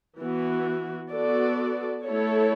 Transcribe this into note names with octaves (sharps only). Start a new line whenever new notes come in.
E3 B3 F#4
B3 F#4 A4 D5
A3 E4 A4 C#5